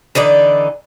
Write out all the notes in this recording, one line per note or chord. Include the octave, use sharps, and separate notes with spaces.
D3 E3 D#4 D5